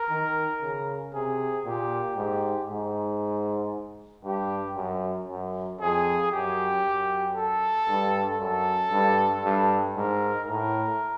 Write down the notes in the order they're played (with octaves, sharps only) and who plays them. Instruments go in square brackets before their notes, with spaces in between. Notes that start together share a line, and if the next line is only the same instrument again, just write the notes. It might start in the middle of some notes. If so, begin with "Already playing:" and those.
Already playing: [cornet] A#4
[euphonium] D#3
C#3
[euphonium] C3 [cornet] G#4
[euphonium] A#2 [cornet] G4
[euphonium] G#2 [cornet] G4
[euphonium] G#2
[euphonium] G2 [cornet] G4
[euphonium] F#2
F#2
[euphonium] F2 [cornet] G#4
[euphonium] F#2 [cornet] G4
[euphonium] F#2
[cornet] A4
[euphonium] G2
[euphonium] F#2 [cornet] A4
[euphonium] G2
G2
[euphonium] G#2 [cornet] A#4
[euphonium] A2 [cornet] A#4